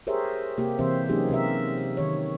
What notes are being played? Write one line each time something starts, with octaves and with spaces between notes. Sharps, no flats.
G4 G#4 A#4 C5 C#5 E5
C3 A#3 G4
C3 E3 C4 C5 E5
F#3 A#3 C#4 D#4 G4 G#4
C3 G4 A#4 E5
D#3 C#5